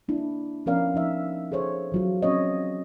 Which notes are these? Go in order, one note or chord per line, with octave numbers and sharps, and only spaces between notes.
A#3 D4 E4
F3 B3 C#4 A#4 D5 F5
F3 D#4 E5
G#4 A4 C5 C#5
E3 F#3 F4
C4 C#4 C#5 D#5